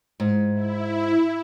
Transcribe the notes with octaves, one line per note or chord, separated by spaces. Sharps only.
G#2
E4